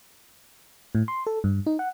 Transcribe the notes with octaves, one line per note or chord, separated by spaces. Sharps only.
A2
C6
A4
G2
D#4
F#5